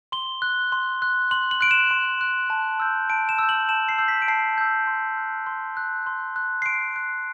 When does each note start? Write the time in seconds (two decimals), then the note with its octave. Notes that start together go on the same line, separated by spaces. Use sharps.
0.12 C6 G7
0.42 F#6
0.72 C6
1.02 F#6
1.31 C6 F#7
1.51 F#7
1.61 F#6 D7
1.71 E7
1.91 C6
2.21 F#6
2.50 A5
2.80 E6 G6
3.10 A5 D7
3.29 E7
3.39 E6 G6
3.49 F#7
3.69 A5 E7
3.89 C7
3.98 E6 G6
4.08 B6
4.22 D7
4.28 A5 C7
4.58 E6 G6
4.87 C6
5.17 F#6
5.47 C6
5.77 F#6
6.07 C6
6.36 F#6
6.62 C7
6.66 C6 D7
6.96 F#6